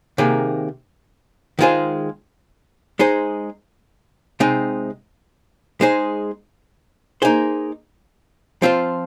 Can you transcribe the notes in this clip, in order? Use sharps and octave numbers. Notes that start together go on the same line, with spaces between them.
C3 D#3 A#3 G#4
D#3 G#3 F4 G#4 C5
G#3 D#4 G#4 C5
C3 G#3 C4 D#4
G#3 D#4 G#4 C5
A#3 D#4 G#4 C5
F3 C4 F4 C5